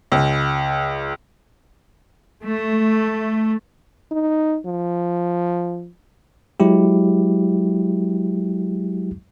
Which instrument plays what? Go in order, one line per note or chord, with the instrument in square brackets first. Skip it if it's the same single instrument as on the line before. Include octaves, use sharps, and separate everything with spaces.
[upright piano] C#2
[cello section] A3
[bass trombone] D#4
F3
[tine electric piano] F#3 G#3 E4 G4